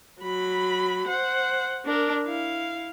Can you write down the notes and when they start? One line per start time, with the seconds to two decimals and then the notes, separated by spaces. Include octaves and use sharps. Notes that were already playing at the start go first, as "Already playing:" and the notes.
0.21 F#3 B5
1.07 C5 F#5
1.85 D4 A#4
2.24 E4 F5